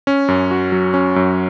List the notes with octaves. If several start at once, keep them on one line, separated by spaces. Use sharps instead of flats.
C#4
F#2
F#4
F#3
C#4
F#2